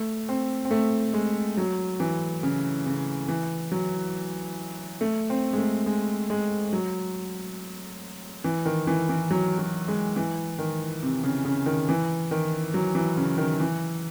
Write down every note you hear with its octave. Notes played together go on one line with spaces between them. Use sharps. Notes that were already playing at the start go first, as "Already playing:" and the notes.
Already playing: A3
C4
C4
A3
G#3
F#3
E3
C#3
C#3
E3
F#3
A3
C4
G#3
A3
G#3
G#3
F#3
E3
D#3
E3
E3
F#3
F#3
G#3
E3
D#3
C3
C#3
C#3
D#3
E3
D#3
F#3
E3
C#3
D#3
E3